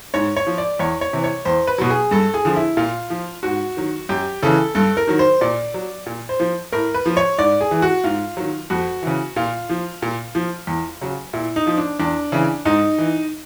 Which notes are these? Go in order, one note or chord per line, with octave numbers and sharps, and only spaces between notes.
G#2 C#5
C#5
F3
D5
E2 C#5
C#5
C3 E3
C#5
E2 C5
B4
B2 F#3
G#4
G2 A4
G#4
D3 F3
E4
A#2 F4
F3
G#2 F#4
D#3 F#3
F#2 G4
C#3 E3 A4
G2 A4
A#4
D#3 F#3
C5
A#2 D5
F#3
A#2
C5
F3
A2 A#4
B4
F3
C#5
G#2 D5
G#4
E3
F#4
G#2 F4
D#3 F#3
F2 F#4
C#3 E3
A#2 F4
F3
A#2
F3
E2
C#3 F#3
A#2 E4
D#4
F3
D4
E2 D4
C#3 E3
G#2 D#4
E3